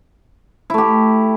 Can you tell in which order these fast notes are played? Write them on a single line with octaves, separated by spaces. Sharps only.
E4 A3 G4